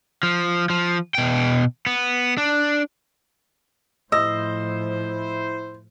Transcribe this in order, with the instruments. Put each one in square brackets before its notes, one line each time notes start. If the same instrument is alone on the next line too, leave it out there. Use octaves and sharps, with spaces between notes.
[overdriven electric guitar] F3
F3
B2 G5
B3
D4
[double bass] A2 F3 [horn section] E4 C5 [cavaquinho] D#5 [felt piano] E6